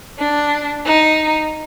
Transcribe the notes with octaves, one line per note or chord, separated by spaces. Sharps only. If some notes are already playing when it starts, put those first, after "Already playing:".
D4
D#4